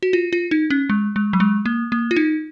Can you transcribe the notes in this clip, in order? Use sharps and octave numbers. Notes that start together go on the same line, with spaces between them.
F#4
F4
F4
D#4
C#4
G#3
G#3
F#3
G#3
A#3
A#3
F4
D#4